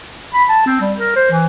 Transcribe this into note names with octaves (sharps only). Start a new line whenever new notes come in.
B5
A5
C4
G3
A#4
C5
E3